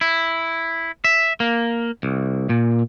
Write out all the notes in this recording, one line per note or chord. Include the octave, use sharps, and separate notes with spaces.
E4
E5
A#3
C2
A#2